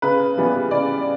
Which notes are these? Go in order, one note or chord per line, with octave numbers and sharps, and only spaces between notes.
C#3 B4
E3 G3 B3
C#3 D5